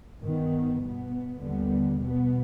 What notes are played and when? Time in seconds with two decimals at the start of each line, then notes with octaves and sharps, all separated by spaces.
0.23 G2 D#3 B3
0.83 B2 B3
1.42 D#2 D3 G3 B3
2.00 B2 B3